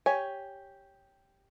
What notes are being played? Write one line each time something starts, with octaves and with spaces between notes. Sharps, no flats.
G4 C#5 G#5